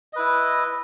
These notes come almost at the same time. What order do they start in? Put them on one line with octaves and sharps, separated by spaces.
D#5 B4 E4